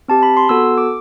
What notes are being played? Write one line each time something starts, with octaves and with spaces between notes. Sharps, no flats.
C4 G4 A5
B5
C6
B3 F#4 A4 E6
D6